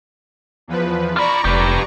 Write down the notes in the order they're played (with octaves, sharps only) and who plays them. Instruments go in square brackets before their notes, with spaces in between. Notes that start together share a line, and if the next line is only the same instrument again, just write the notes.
[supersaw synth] E2 F3 B4
[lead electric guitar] F4 B5 [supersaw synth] D5 A#5 C#6
[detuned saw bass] F1 [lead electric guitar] G4 B4